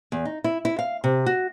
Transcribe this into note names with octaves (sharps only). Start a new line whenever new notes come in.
E2
D#4
E4
E4
F5
C3
F#4